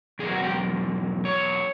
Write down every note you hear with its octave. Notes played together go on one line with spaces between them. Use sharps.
E2 B2 F#3 A#3 G#4
F#4
G4
C#5